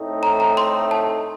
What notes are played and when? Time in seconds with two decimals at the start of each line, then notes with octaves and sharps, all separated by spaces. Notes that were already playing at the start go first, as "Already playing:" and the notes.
Already playing: A2 A3 C4 D#4
0.23 A#5
0.40 A#5
0.57 C6
0.91 A5